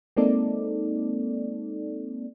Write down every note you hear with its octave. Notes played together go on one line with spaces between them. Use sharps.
G#3 A#3 C4 D#4 A4 D5